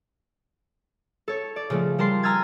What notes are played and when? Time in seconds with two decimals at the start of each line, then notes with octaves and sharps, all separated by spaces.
1.28 A4 C#5
1.56 D5
1.70 C#3 F3 A3
1.98 G3 A#4 A5 C6 C7
2.23 G#5 A#5 E6 F6 G#6 A6